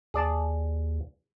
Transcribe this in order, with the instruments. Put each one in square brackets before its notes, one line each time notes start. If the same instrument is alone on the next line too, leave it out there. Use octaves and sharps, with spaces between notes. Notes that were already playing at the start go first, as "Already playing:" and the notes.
[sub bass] D#2 [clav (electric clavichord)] G#4 D5 A5